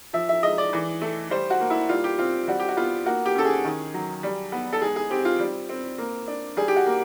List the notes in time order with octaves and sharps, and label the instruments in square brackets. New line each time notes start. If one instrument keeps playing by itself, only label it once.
[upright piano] F3 E5
E5
G#3 D#5
D5
E3
A3
G3 C5
F#4
A#3
E4
G3 F4
G4
C4 F4
G3 F#4
G4
F#4
B3 F4
A#3 F#4
G4
C#4 A4
G#4
D#3
F#3
G3
B3
A4
G#3 G#4
G#4
C4 G4
F4
G3
C4
A#3
D4
G3 G#4
G4
F#4
A#3